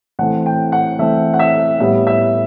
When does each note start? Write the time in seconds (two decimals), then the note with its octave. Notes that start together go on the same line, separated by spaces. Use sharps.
0.19 E3 A3 C4 F#5
0.46 G5
0.72 F#5
0.99 E3 A3 C4 E5
1.34 F#5
1.39 E5
1.80 A2 G3 B3 E5
2.07 E5